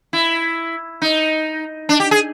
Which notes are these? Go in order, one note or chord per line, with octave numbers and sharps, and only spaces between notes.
E4
D#4
D4
G4
G#4